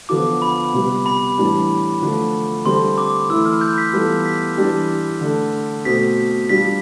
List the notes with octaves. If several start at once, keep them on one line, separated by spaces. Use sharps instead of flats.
D3 F3 B3 F4 A4 D6
B5
C3 G3 B3
B5
A2 E3 G3 D4
D3 F3 A3 D4 A4
D3 G3 C4 F4 A4 C6
D6
E3 A3 E4 E6
F6
G6
B6
E3 G3 B3 F4 A4
B6
E3 G3 D4 G4
D3 A3 D4 A4
B2 A3 C4 B6
G3 D4 F4 B6